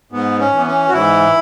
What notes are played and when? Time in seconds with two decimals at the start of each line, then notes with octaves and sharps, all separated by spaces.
0.12 G#2 B3
0.39 C#4
0.53 E3
0.58 B3
0.66 C#4
0.89 F#4
0.93 G#2 E3 E4